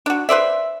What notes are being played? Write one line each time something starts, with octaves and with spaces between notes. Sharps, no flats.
D4 F#4
B4 C5 D5 E5